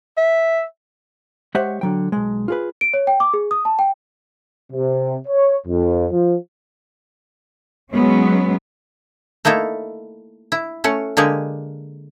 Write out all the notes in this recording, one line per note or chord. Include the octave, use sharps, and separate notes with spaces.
E5
G#3 G4 C5 C#5 E5 F#5
D3 F#3 G5
B1 G#3
F4 G#4 B4
D7
C#5
G5
D6
G#4
D#6
A5
G5
C3
C#5
F2
F3
F#3 G#3 B3 C#4
A3 A#3 D#4 E4 A4
E4
A3 C#4 F#5
D3 G#3 A#3 G4 G#4